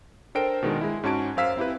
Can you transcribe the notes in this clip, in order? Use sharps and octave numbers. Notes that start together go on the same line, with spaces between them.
D4 A4 A#4 C5 G5 D7
B2 D#3 G#3 D4
G#3 E4
G#2 C#4 F#4 A5 G#6 D7
F#2 C5 F5 E6 B6
C4 E4 G4 B4